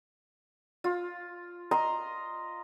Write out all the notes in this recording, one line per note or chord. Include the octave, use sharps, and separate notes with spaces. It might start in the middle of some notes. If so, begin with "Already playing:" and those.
F4
D#5 A#5 C6